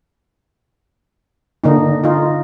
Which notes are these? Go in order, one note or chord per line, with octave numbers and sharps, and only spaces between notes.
D3 A#3 D#4
D#4 F4